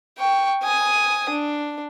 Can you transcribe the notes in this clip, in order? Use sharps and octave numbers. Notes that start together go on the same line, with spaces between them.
G5 C#6
G#5 D#6
D4